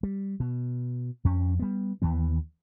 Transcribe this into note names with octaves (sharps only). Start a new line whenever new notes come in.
G3
B2
F2 C#4
G3 B3
D#2 E3 B3